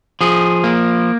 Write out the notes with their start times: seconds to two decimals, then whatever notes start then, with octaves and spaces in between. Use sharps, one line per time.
0.21 F3 G#4
0.64 A#3